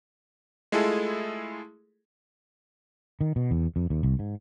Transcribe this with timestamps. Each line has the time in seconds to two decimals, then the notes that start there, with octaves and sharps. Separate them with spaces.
0.72 G#3 A3 E4 F4 G#4 A4
3.21 D#3
3.36 B2
3.51 E2
3.76 F2
3.90 D#2
4.03 C2
4.19 G#2